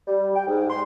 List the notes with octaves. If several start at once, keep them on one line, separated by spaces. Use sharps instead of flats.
G3
G5
G#2
C6